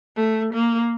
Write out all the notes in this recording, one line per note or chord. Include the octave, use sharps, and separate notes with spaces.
A3
A#3